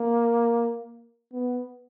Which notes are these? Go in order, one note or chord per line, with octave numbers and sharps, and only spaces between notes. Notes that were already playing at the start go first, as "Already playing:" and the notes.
Already playing: A#3
B3